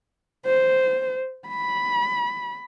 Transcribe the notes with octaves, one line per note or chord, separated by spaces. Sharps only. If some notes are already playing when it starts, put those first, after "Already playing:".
C5
B5